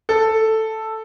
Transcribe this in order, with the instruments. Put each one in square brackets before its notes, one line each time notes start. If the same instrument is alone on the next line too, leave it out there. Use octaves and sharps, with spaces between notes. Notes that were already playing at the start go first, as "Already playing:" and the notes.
[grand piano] A4